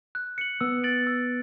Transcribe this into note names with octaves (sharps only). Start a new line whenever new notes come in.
F#6
C#7 F#7
B3 E6
A6 D7 F#7
E6